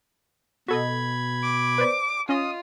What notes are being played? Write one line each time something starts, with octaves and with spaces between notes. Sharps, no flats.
B2 F#4 A4 D#5 B5 G#6
D6
B4 C5 D5
C#4 F4 D#5 D#6